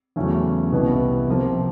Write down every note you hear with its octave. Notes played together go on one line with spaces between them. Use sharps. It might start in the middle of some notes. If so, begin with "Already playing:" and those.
E2 C#3 F#3 A3 C#4
C2 B2 G3 B3 E4
C3 F3 A#3